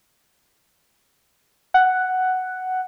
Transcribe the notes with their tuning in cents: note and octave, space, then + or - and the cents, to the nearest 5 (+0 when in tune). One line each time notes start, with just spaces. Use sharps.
F#5 +5